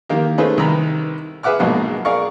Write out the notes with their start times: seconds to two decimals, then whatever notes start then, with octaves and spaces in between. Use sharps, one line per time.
0.09 D#3 A#3 G4
0.38 A3 C#4 D#4 G#4 B4 C5
0.57 C2 D#3 D#4 B4 A#5 B5
1.43 G#4 B4 E5 F#5 D6 F6
1.59 A#1 G#2 B2 F#3 A#3 G#4
2.05 G#4 A#4 D5 F5 C#6